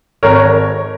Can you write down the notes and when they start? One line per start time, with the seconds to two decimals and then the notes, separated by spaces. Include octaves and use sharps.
0.23 G#1 A#4 C#5